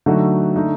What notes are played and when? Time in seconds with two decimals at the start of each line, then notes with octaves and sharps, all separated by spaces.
0.06 D3 F#3 A3 D#4 F#4
0.56 D3 A3 D#4